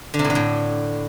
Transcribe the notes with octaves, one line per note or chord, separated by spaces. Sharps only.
D3
C3
A2
D3
A2